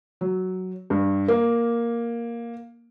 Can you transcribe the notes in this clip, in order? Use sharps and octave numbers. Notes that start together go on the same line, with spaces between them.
F#3
G2
A#3